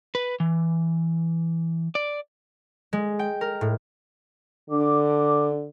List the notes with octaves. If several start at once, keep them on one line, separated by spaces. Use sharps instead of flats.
B4
E3
D5
G#3
G5
A#4
A2
D3 D4 D6